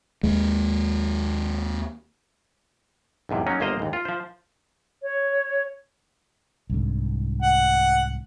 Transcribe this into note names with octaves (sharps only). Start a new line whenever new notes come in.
D#2 G#3
B1 E2 G#2 C3
F#3 A#3 C#4 D#4
G1 A#3 C5 D#5 A#5
D#2 G#2
F4
F3 C5
C#5
C2 G#2 D3
F#5